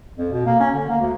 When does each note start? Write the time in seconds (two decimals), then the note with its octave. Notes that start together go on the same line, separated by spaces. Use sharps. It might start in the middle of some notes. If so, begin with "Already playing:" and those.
0.18 F2
0.32 B2
0.46 A#3
0.60 C#4
0.74 D3
0.89 A#3
1.01 D2